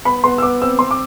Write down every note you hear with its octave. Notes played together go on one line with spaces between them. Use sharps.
B3 B5
B3 C6
E6
B3 D6
C4 E6
C4 C6
D6